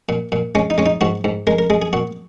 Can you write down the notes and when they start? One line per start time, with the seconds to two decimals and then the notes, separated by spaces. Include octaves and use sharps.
0.09 A#2
0.32 A#2
0.55 G#3 C#4
0.70 D#4
0.78 G#3 C#4
0.86 D#4
1.01 G#2 F#4
1.24 G#2
1.47 G#3 A#4
1.59 A#4
1.70 G#3 G#4
1.82 G#4
1.93 A#2 F#4